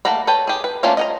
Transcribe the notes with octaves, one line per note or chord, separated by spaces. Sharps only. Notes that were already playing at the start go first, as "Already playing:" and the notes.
A3 A#3 F#5 A#5 B5
A4 B4 C#5 G5
G4 G#4
B4
A3 A#3 C#4 D4 F4
D#5 F#5 A#5